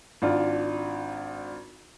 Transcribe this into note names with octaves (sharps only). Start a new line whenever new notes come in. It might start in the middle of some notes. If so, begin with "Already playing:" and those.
G#1 D4 F4